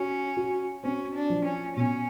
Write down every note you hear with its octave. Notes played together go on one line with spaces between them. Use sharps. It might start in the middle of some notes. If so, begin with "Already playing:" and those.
Already playing: C#4 F#4
F#4
C4 C#4
D4
F3
C#4
B2 C#4